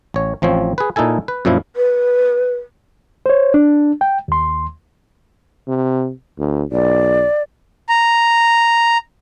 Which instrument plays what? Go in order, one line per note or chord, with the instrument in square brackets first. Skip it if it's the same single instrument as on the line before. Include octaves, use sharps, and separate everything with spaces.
[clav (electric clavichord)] A1 C#5
A1 F3 C4 C#5
G#4 B4
A#2 D#4 E4 A4 G#5
B4
F#2 A#2 F3 E4
[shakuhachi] B4
[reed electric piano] C5 C#5
D4
G5
D#2 C6
[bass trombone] C3
D2
[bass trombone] B1 [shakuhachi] D5
[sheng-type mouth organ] A#5